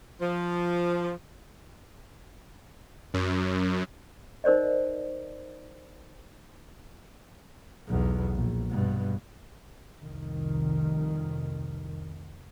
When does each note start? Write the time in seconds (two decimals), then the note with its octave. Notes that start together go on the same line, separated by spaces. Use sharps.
0.20 F3
3.14 F#2
4.44 D#4 A#4 C5 D5 D#5
7.88 B1 E2
8.36 A#1
8.70 G2 B2
10.02 F1 C2 F2 D#3